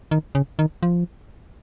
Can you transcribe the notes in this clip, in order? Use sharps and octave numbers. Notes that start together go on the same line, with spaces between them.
D#3
C#3
D#3
F3